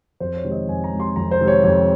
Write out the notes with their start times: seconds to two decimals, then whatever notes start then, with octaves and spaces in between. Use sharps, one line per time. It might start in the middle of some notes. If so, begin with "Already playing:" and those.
0.20 F2 C5
0.37 C#5
0.44 C3 D#3 G#3
0.51 D#5
0.67 F2 G#5
0.84 A#5
0.92 C3 D#3 G#3
1.00 C6
1.16 F2 A#5
1.31 C5
1.41 C3 D#3 G#3
1.48 C#5
1.64 F2 C#5